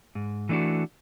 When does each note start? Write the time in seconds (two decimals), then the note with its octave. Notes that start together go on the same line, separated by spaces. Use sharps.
0.15 G#2
0.49 E3 A3 D4 F#4